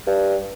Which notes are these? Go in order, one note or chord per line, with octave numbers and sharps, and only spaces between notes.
G2